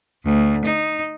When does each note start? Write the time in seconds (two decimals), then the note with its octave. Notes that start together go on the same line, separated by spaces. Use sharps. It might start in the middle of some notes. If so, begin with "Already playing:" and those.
0.25 D2
0.65 D#4